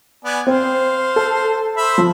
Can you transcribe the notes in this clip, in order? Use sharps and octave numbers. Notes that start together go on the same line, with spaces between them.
B3 D5 G#5
C4 C5 F5
A4
C5 E5 B5
F3